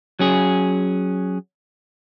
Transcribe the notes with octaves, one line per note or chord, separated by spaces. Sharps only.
F#3 C#4 G#4